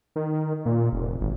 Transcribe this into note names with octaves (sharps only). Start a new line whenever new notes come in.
D#3
A#2
F1
G#1